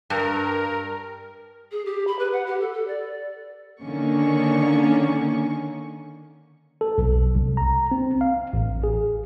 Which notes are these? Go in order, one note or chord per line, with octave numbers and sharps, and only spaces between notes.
G2 A#4
G#4
G4
B5
B4
F#5
G4
A4
A4
D5
D3 D#3 A#3 C#4 C#6
A4
B1
C2
A#5
C4
F5
A1
G#4